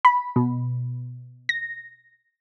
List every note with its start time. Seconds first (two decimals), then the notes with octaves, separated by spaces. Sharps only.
0.05 B5
0.36 B2
1.49 A#6